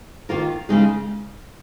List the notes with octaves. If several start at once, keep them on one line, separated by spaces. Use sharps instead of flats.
D#3 A#3 F4 A#4
C#3 G#3 D#4 G#4